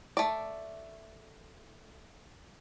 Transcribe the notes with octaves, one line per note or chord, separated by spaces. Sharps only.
A3 D5